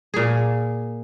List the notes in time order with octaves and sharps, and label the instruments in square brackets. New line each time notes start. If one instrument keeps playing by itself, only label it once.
[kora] A#2 G#4